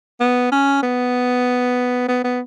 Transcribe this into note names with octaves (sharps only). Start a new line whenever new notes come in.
B3
C#4
B3
B3
B3